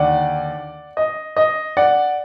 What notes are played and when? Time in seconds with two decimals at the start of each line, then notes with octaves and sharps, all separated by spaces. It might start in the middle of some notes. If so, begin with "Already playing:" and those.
Already playing: D#2 D3 D5 F#5
0.97 D#5
1.37 D#5
1.77 D5 F#5